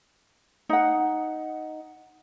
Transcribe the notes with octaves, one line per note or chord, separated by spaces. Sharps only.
D#4 F#5